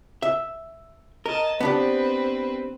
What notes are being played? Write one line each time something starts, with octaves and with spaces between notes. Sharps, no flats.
E5
A#4 D#5 A5
B3 C4 D4 G4 B4